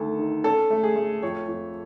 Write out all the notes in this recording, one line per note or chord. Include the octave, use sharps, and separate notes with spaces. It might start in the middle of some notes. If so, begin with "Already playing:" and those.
Already playing: D2 D#3 A4
D#3
C#4 A4
A3
G#4
A3
F2 C#5
F2